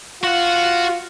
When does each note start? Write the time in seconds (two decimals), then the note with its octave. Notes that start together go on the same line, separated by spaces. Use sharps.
0.23 F4 F#4 F#5